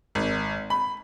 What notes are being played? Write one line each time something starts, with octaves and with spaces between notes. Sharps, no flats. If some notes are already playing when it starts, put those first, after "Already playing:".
G#1
B5